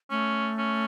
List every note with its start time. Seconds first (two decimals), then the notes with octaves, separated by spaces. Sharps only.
0.11 A3 C#4
0.58 C#4